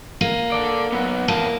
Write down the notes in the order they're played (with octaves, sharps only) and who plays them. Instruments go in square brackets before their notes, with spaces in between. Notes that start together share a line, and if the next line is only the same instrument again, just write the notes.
[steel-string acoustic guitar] A#3
[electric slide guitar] A4 D5
F#3 B3
[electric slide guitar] E2 A5 [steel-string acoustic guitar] A#3